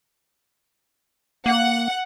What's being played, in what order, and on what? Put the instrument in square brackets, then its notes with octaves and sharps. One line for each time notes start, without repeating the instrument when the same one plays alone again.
[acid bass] A#3 [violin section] F#5